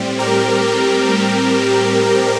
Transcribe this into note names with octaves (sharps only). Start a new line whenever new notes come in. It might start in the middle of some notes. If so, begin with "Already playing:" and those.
Already playing: A2 G3 C4
G4 A#4